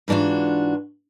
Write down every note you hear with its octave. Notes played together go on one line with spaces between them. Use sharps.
G#2 E3 D4 F4 F#4